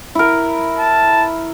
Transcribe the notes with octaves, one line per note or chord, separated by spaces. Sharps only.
E4 A#4
A5